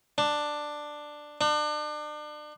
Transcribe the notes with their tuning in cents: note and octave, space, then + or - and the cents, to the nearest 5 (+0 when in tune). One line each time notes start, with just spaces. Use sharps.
D4 +10
D4 +35